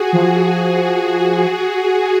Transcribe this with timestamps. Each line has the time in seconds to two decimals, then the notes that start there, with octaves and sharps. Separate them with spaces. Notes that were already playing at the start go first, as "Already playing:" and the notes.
Already playing: F#4 G#4
0.13 F3